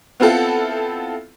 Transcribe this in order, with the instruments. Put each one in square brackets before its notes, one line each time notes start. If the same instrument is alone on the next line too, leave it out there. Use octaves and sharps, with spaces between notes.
[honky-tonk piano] B3 C4 E4 F4 A4 F#5